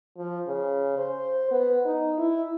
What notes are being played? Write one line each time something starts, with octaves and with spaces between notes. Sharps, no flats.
F3
C#3
C5
B3
D#4
E4